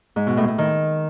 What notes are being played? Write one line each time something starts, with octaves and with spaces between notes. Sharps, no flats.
G#2
B2
A2
A2
D#3